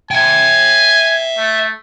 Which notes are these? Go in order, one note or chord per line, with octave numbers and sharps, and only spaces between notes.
E5 G5 G#5
A3